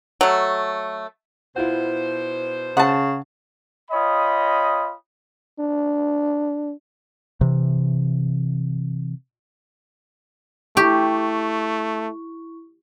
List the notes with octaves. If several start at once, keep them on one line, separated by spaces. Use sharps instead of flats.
F#3 A3
B2 E4 F4 C5 F#5
C#3 F#5 A5
F4 C#5 D#5 G5 B5 D#6
D4
C3 E3
A3 E4 G4 C#6